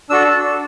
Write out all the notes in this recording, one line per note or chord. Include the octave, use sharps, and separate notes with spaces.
D4 F#4 A4 E6